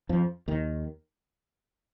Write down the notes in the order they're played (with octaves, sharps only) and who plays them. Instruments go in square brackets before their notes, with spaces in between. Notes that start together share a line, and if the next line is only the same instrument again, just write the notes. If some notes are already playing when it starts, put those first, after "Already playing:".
[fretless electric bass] F2 F3
D#2 D#3